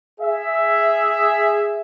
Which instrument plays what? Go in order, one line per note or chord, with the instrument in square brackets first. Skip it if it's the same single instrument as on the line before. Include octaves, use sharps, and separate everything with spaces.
[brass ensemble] G#4 E5